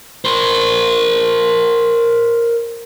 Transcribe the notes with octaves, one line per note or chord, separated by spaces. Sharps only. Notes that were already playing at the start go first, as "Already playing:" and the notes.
A#4 C5